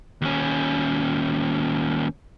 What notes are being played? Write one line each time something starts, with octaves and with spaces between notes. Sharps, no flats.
D#2 C#4